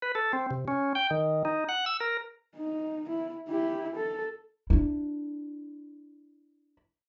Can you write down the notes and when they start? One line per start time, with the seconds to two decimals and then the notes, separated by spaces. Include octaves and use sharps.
0.02 B4
0.15 A4
0.33 C4
0.51 C3
0.68 C#4
0.95 G5
1.11 D#3
1.45 D#4
1.69 F#5
1.86 E6
2.00 A#4
2.56 D#4
3.09 E4
3.48 E4 G4
3.96 A4
4.70 D4 E4